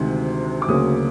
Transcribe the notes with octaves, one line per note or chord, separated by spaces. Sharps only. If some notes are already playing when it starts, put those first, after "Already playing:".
Already playing: D2 C3 D#3 G#3
D6
D2 C#3 F#3 A#3 D#6